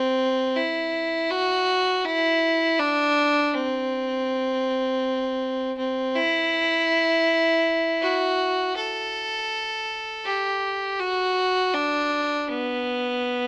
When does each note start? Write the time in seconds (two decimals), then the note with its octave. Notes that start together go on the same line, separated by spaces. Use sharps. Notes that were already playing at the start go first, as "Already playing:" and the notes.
Already playing: C4
0.56 E4
1.31 F#4
2.05 E4
2.80 D4
3.55 C4
5.78 C4
6.16 E4
8.01 F#4
8.76 A4
10.25 G4
11.00 F#4
11.74 D4
12.48 B3